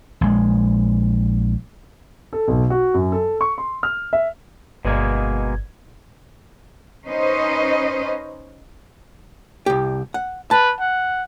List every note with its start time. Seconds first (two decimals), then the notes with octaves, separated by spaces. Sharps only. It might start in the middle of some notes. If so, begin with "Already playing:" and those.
0.21 A#1 G#3
2.33 A4
2.48 B1
2.70 F#4
2.94 F#2
3.12 A4
3.41 C#6
3.58 C6
3.83 F6
4.13 E5
4.85 G1 B2 G#3 A#3 G#6
7.07 C#4 D#4 B4 C5 D#5
9.66 C2 G4
10.14 F#5
10.51 B4 A5
10.80 F#5